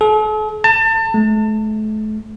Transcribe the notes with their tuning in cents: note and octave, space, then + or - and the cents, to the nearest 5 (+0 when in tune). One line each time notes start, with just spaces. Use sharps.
A4 -45
A5 +30
A3 -35